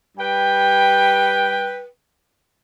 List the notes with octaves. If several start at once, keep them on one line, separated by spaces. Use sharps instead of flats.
G3 B4 G5